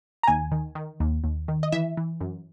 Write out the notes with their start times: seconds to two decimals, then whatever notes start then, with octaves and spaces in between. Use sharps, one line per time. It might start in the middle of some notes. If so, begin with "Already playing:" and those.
0.23 A#5
0.27 D#2 G#5
0.52 D#3
0.75 D#3
1.00 D#2
1.24 D#2
1.48 D#3
1.63 D#5
1.72 E3 E5
1.97 E3
2.21 F#2